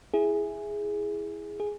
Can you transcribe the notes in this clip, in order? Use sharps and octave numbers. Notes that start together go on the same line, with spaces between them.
E4 G#4
G#4